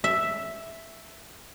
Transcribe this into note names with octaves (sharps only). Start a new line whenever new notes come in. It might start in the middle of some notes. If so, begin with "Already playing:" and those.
E5